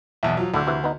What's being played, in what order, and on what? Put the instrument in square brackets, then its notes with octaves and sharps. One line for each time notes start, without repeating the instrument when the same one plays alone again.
[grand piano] B1 E2 [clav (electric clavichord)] E5
[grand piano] F3 F#3
[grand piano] D2 [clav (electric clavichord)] A2 D3
[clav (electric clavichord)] C3 E3 E4
B3 D#4